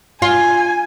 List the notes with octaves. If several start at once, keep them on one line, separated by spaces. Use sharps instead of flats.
F4 G#5